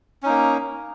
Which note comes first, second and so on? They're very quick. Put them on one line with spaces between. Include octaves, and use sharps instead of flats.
C#4 D#4 A#3